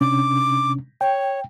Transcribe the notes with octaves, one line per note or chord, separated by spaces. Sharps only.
C3 C#4 D4 D6
C#5 G5